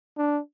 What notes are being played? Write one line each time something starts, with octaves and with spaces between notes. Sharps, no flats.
D4